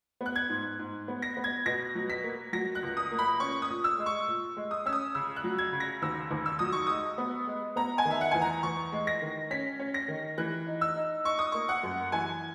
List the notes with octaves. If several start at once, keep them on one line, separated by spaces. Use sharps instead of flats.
B3
F#6
G#6
G#2
G#2
B3
A#6
B3
G#6
B2 A#6
F#3
B6
A#3
F#3 A#6
F#6
C#2
D#6
A#3
B5
C#4 C#6
D#6
A#2
E6
G#3
C#6
A#2
G#3
D#6
C#4 E6
D#6
C#3 E6
F#6
F#3
G#6
C#3
A#6
D#2 E6
D#2
E6
F#3 D#6
C#6
G#3 D#6
B3
G#3
B3 A#5
G#5
D#3
E5
F#5
E2 G#5
A#5
E2 C#6
G#3
A#6
D#3
C#4 B6
C#4
A#6
D#3
E3 F#6
D#4
E6
D#4
D#4 C#6
D#6
A#3 C#6
F#5
F#2
E3 G#5